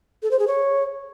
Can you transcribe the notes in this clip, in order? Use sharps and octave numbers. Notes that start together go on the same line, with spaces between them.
A4
C5
G#4
C#5